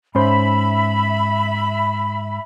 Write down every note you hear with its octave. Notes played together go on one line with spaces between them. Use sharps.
G#2 C#4 C5 E5 B5